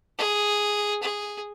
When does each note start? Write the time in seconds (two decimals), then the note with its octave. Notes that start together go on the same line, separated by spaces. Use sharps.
0.18 G#4
1.02 G#4